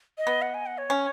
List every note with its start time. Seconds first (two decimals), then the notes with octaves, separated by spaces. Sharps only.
0.18 D#5
0.27 B3
0.42 F#5
0.54 G#5
0.66 F#5
0.78 C#5
0.90 C#4